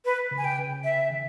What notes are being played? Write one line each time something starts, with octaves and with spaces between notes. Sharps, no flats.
B4
C#3
G#5
G5
C#3
E5
D#3